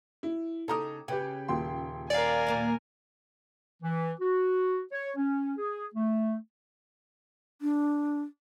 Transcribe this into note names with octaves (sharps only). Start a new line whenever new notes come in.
E4
C#3 D#4 G4 A4 A#5 D#6
C#3 G4 B4 G5
D#1 G5 C6
A#4 C#5 D5 F5 G#5
A#2 A#3 D4
E3
F#4
C#5
C#4
G#4
A3
D4